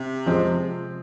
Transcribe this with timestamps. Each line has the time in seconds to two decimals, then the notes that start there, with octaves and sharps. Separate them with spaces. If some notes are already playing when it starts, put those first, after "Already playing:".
Already playing: C3
0.26 F3 G#3 C4